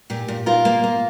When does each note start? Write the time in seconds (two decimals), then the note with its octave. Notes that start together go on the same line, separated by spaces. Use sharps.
0.10 A#2 G4
0.28 A#2
0.46 A#2 F4 A#4
0.65 A#3
0.84 A#3